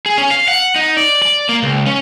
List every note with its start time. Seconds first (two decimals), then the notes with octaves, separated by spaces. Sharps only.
0.06 G#4
0.18 C#4
0.31 F5
0.48 F#5
0.76 D#4
0.97 D5
1.23 D5
1.49 A#3
1.63 C#2
1.87 C#4